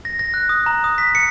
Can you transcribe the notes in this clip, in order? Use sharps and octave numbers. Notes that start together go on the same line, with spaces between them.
A#6
A#6
F#6
D#6
A#5
D#6
B6
C#7